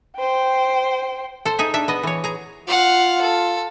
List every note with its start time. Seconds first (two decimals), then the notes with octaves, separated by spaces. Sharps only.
0.16 C5 G5
1.45 A4 C5
1.59 D#4 G#4 E5
1.74 D4 E5
1.88 B3 D#5
2.03 E3 C#5
2.24 G#4 A#5
2.68 F4 F5 F#5
3.21 A4